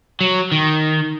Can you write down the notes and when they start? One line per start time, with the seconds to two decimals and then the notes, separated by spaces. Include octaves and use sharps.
0.21 F#3
0.52 D#3